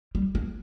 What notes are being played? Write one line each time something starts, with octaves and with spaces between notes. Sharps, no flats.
G3
A#3